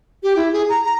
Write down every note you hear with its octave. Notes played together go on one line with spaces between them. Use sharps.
G4
E4
G#4
A#5
A#5